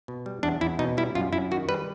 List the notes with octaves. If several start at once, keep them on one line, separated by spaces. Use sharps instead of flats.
B2
G3
E2 D4
E2 E4
B2 D#4
G3 E4
F#2 F4
F#2 E4
D#3 F#4
G3 B4